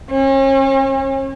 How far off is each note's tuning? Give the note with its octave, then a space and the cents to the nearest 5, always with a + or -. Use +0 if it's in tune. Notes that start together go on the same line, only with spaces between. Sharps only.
C#4 -40